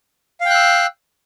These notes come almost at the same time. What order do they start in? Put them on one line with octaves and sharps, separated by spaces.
F5 G5 F#6 E6